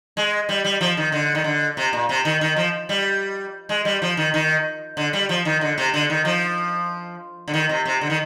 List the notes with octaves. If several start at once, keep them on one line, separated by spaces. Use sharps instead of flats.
G#3
G3
G3
F3
D#3
D3
D#3
D3
C3
A#2
C3
D#3
D#3
F3
G3
G#3
G3
F3
D#3
D#3
D3
G3
F3
D#3
D3
C3
D3
D#3
F3
D3
D#3
C3
C3
D3
D#3